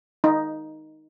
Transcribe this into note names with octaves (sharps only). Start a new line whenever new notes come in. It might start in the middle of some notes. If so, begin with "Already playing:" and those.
D#4